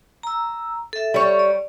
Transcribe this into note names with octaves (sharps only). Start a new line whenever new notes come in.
A#5 E6
A4 E5
G3 C#5
D5